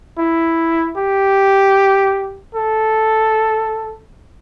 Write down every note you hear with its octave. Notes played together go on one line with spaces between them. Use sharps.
E4
G4
A4